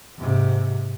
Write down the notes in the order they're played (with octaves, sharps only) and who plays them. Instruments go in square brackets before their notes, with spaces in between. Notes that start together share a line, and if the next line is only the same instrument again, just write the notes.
[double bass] G#2 C3